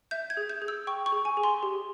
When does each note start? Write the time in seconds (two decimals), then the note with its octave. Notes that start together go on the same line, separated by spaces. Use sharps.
0.11 E5 G6
0.30 G#6
0.37 G#4
0.49 G6
0.62 G#4
0.68 E6
0.87 G5 C#6
1.06 C#6
1.12 G#4
1.25 G#5
1.37 G#4
1.43 C6
1.63 G4